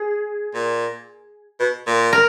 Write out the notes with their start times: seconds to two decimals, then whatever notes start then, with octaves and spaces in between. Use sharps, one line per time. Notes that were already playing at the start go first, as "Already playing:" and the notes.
Already playing: G#4
0.54 A#2
1.60 B2
1.87 A#2
2.13 A#4